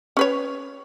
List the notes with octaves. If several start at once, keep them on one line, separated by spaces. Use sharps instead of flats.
C#4 B4 C#5